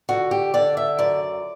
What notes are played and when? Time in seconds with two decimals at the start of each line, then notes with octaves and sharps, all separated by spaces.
0.09 D3 F#4
0.31 G4
0.54 D3 D5
0.77 E5
0.99 F#2 D5